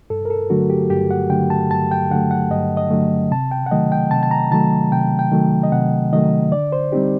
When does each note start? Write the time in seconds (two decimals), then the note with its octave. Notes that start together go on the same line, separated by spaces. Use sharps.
0.10 G2 A4
0.25 A#4
0.30 A4
0.50 D3 F#3 A3 F#4
0.70 G4
0.90 G2 G4
1.11 F#5
1.30 D3 F#3 A3 G5
1.50 A5
1.71 G2 A5
1.91 G5
2.10 D3 F#3 A3 F#5
2.31 F#5
2.51 G2 D#5
2.77 D#5
2.91 D3 F#3 A3
3.31 C3 A5
3.51 G5
3.66 F#5
3.71 D#3 F#3 A3 D#5
3.92 G5
4.11 C3 A5
4.23 A5
4.31 A#5
4.52 D#3 F#3 A3 A5
4.92 C3 G5
5.19 G5
5.32 D#3 F#3 A3
5.63 D#5
5.72 C3 F#5
6.13 D#3 F#3 A3 D#5
6.52 D3 D5
6.72 C5
6.92 G3 C4 D#4 G4